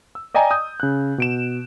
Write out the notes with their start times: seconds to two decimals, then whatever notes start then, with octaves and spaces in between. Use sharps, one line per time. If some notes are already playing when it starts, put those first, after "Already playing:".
0.15 E6
0.34 D5 D#5 G5 G#5 A#5
0.51 D#6 G6
0.80 C#3 F#6
1.18 B2 D7 E7